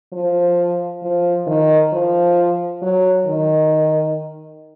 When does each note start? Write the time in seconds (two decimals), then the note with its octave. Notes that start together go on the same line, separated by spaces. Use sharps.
0.13 F3
1.03 F3
1.47 D#3
1.93 F3
2.82 F#3
3.27 D#3